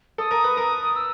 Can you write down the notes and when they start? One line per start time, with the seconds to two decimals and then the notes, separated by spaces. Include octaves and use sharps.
0.18 A4 D#6
0.31 A#4
0.44 B4
0.57 A#4
0.96 E6